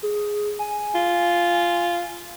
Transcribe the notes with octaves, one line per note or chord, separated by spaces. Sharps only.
G#4
G#5
F4